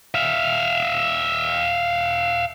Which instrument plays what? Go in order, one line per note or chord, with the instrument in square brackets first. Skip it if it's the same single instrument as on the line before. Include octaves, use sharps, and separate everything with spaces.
[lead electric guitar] E5 F5